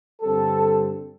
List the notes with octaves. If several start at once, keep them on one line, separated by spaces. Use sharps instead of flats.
G2 D3 G3 C4 A4